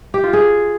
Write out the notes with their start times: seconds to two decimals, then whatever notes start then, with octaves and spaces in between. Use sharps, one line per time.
0.14 G4
0.24 F4
0.33 G#4